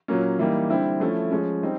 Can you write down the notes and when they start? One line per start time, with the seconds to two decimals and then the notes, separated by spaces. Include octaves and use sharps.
0.08 A#2 F#3 A#3 C#4
0.39 E3 G3 A#3 D#4
0.69 D3 G3 C4 E4
1.00 F3 A3 C#4 E4
1.31 F3 G#3 C#4
1.63 G3 C4 D#4